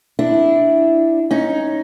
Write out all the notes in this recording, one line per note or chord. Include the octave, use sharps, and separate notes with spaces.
D4 E4
C#4 D#4